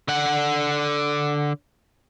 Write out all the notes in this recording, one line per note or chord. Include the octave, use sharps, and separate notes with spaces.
D3 F#5